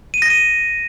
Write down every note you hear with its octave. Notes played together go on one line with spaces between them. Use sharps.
D#7
A#6
D#7